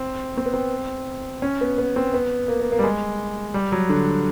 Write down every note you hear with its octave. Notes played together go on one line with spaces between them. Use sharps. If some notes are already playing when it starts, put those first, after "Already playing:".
Already playing: C4
C4
B3
C4
C#4
B3
B3
C4
B3
A#3
A#3
A#3
G3
G#3
G3
F#3
D3